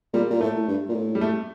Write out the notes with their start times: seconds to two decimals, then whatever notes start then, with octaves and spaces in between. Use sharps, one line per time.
0.13 A#2 G3
0.30 A#2
0.40 A2 A3
0.68 G2
0.89 A#2
0.95 A2
1.15 G3
1.21 A3